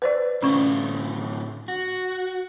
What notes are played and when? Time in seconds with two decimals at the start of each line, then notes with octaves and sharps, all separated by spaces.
0.02 B4 C5 D5
0.42 A2 D3 C#4 F4 C#6
1.68 F#4